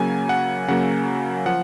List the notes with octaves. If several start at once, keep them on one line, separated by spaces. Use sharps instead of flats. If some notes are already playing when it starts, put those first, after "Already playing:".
Already playing: C#3 F#3 A#3 G#5
F#5
C#3 F#3 A#3 F#5
F3 F#5